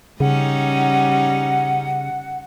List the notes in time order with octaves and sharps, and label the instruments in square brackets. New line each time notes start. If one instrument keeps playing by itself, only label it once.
[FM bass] C#3 [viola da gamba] G3 C#4 D#4 [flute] F#5